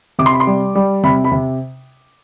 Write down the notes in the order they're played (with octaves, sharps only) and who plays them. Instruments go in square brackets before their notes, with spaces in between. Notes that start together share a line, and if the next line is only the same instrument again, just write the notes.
[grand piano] C3 D6
C6
B5
C6
G3
G3
C3 B5
B5
C3